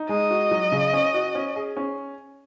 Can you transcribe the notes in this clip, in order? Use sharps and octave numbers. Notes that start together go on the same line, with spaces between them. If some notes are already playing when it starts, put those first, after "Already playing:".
Already playing: D#4
G#3 D#5
F#4
F#3
C#3
C#4
F#4
C#4
G#4
C#4